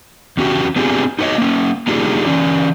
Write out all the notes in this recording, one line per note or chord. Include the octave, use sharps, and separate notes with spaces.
E2 C#4 F#4 G4
B3 C4 D4 F4 G4 G#4
D#4 F#4 B4 C#5 D#5
A#3 C#4
A#3 D4 D#4 F4 G4 G#4
E3 C#4 D5